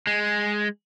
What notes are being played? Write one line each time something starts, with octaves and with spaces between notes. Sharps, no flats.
G#3